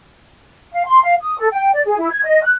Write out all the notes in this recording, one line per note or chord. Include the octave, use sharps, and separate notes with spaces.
F5
C6
F5
D#6
A4
G5
D5
G#4
E4
G#6
D#5
F#6